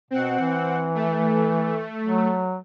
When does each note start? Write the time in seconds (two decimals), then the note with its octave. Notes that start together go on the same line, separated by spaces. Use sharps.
0.11 B2 C4 F#5
0.40 E3
0.95 A3
2.03 F#3